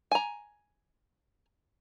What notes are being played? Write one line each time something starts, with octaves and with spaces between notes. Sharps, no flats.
G#5 A#5